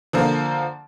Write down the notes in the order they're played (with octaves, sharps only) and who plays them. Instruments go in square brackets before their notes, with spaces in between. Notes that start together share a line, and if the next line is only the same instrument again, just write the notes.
[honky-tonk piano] D3 F3 A#3